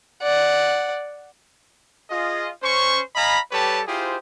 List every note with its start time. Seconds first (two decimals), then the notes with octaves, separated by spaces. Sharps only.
0.22 D5 F#5
2.10 F4 G#4 D#5
2.63 C#4 C5 C#6
3.16 D#5 F5 G#5 A#5 B5
3.52 G3 G4 A4 B4 C#5 A5
3.87 E4 F4 G4 G#4 C5